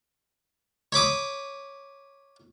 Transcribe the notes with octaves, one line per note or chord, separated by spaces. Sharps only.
C#5 B5 D6 D#6